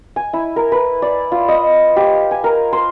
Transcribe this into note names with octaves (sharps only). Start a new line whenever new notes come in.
G#5
E4
A#4
B4
D5
F4
D#5
G4
G#5
A#4
C5